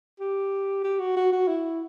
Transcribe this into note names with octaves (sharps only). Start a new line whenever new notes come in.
G4
G4
F#4
F#4
F#4
E4